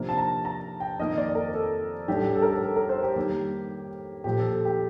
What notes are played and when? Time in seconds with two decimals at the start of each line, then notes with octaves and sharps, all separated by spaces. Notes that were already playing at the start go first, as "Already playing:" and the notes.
Already playing: C3 F3 A#3 D4
0.09 A5
0.18 A#5
0.45 A#5
0.80 G5
0.99 F2 D#3 A#3 D#5
1.18 D5
1.35 A#4
1.54 A4
2.08 A2 G3 D4 G4
2.16 A4
2.25 G4
2.35 A4
2.42 A#4
2.51 A4
2.62 A4
2.76 A#4
2.89 C5
3.03 G4
3.16 D#3 G3 A#3
4.24 A#2 F3 A3 G4
4.38 A4
4.52 A4
4.65 G4